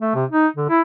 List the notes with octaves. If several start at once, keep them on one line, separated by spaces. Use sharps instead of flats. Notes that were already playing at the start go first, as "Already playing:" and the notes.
A3
C3
D#4
D3
E4